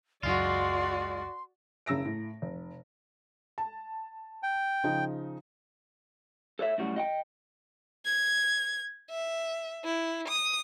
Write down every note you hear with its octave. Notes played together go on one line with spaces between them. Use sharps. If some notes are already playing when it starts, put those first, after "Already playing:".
C#2 F#2 F#3 G#3 F4 F#4 D5 C6
F#1 C#3 E6 A#6 D7
A2
F1
A5
G5
C#3 F3 D#4
A4 C#5 D5 E5
F#2 A2 F#3 G3 F#4
D#5 F#5 G5
G#6
E5
E4
D#6